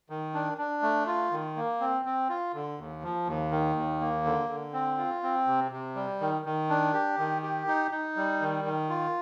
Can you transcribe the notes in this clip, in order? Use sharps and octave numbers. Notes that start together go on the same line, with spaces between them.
D#3
D4
D4
A3
F4
D#3
A#3
C4
C4
F4
D3
D#2
F3
D#2
D#3
D#2
A#3
D3
D3
C4
F4
C4
C3
C3
G3
D#3
D#3
D4
G4
D#3
G4
D#4
D#4
G3
D#3
D#3
F4